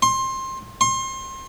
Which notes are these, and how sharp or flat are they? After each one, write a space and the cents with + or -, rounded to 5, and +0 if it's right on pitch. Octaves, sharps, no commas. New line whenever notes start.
C6 +25
C6 +35